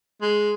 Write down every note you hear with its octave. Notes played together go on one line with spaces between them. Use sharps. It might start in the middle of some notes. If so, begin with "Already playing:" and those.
G#3